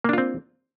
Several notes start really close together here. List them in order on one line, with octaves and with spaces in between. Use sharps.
A#3 D4 F4 C4